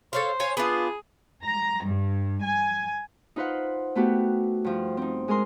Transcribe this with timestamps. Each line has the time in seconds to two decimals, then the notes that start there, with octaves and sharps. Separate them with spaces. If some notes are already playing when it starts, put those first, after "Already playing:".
0.13 A4 C5 C#5 F5
0.40 C#5 F5 G#5
0.57 B3 D4 F4 G#4
1.45 A#5
1.84 G2
2.43 G#5
3.36 D#4 F4 B4 C5 F5 F#5
3.95 A3 B3 F#4 G4
4.64 G2 F3
4.97 C4 D#4
5.28 G#3 G#4 A#4 C6